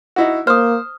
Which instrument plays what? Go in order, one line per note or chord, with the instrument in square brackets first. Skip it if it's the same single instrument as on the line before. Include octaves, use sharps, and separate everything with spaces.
[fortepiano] D#4 E4 F#4
[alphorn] A#3 [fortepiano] C5 [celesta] D#6 F6